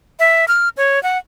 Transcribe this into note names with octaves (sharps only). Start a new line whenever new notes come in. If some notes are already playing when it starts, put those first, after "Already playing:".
E5
F6
C#5
F#5